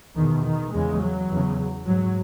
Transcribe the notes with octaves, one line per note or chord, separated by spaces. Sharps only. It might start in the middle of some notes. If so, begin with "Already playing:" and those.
E2 B2 D#3
D#3
E2 C#3 G#3
F#3
E2 C#3
G#2 F#3